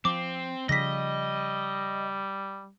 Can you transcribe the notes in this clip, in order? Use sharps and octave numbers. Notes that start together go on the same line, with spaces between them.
F3 C4 D6
C#3 F3 G3 D#5 A#6 B6